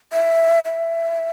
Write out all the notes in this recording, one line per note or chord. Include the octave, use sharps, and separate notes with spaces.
E5
E5